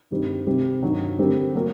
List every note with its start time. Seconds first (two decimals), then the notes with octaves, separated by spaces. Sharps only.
0.11 G2 D#3 G3 C4
0.47 C3 G3 C4
0.83 G2 D#3 F#3
1.18 D3 G3 C4 G4 A#4
1.55 F#3 A#3 F#4 A#4